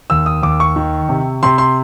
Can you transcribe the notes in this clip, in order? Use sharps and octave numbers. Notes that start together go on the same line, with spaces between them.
D#2 E6
D#6
D#2 D6
C#6
D#3
C3
C3 C6
C6